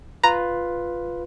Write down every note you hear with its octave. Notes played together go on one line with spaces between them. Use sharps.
F4 B4 A#5